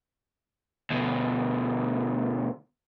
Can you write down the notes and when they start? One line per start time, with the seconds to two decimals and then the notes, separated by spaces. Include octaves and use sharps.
0.90 D2 B2